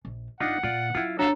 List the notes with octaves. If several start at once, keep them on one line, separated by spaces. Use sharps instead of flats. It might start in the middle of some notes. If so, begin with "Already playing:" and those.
A#1
G#1 D4 D#4 F4 F#5
A#2 F4 D5
F#3 C#4 E4 F4
D4 F#4 A4 C#5 E5 F5 A#5